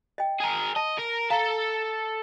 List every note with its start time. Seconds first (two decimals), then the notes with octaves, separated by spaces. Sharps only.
0.18 D#5 G5
0.40 G#4 A#4
0.76 D#5 A5
0.98 A#4
1.30 A4 F5 A5 A#5